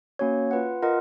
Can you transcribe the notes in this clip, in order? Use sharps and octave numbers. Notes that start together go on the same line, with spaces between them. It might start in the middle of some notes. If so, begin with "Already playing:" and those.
A#3 C#4 F#4 C#5
F4 B4 F#5
F4 A#4 D#5 F#5